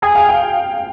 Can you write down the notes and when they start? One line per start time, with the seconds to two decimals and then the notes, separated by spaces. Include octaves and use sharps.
0.02 G#4 G5
0.15 F5
0.29 G5